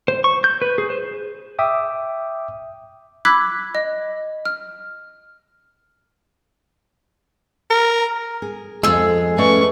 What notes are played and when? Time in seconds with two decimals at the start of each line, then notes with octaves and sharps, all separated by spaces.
0.08 C5
0.24 C#6
0.44 G6
0.62 B4
0.78 G#4
0.90 C5
1.59 E5 G5 D6 D#6
3.25 B5 D6 E6 F#6 G#6 B6
3.75 D#5
4.45 F6
7.71 A#4
8.42 G#4
8.83 F2 G#3 F4 G#4 A4 E6
9.38 A3 C#4 B4 D5 D#5 C#6